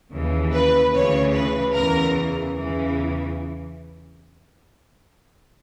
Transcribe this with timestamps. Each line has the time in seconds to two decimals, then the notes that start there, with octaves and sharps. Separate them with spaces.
0.12 D#2 C#3 E3
0.53 B4
0.93 D2 C#3 E3 C#5
1.34 B4
1.75 E2 C#3 E3 A#4
2.57 E2 C#3 E3